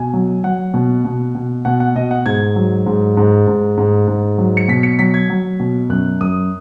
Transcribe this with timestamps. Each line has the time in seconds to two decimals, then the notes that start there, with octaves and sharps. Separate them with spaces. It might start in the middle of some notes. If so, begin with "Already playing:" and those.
Already playing: B2 G#5
0.13 F#3
0.44 F#3 F#5
0.74 B2
1.05 B2
1.35 B2
1.65 B2 F#5
1.80 F#5
1.95 B2 D#5
2.11 F#5
2.26 G#2 G#6
2.56 F#3
2.86 G#2
3.17 G#2
3.47 G#2
3.77 G#2
4.08 G#2
4.38 F#3
4.57 C#7
4.68 B2 B6
4.83 C#7
4.99 F#3 B6
5.14 G#6
5.30 F#3
5.60 B2
5.90 F#2 F#6
6.21 F#2 D#6